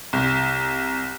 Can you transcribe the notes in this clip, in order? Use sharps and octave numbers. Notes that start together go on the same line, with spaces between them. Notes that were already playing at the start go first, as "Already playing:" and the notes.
C2